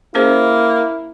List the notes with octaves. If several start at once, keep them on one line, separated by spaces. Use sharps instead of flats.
A#3 C#4 E4 G#4 C5